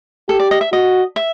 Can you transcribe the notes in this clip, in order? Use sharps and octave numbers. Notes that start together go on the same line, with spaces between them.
G4 A4
D5
D#5
E5
F#4 D#5
E5